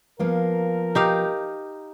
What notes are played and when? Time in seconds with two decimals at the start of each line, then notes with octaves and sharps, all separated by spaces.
0.19 F3 A#3 B3 A#4
0.95 D#4 G4 F5